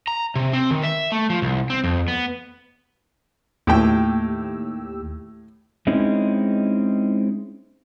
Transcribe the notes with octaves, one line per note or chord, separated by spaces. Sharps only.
A#5
C3
C4
D#3
E5
A3
F3
C2
C4
F2
B3
D#2 A2 G4 G5 E6
G#3 C4 C#4 D#4 E4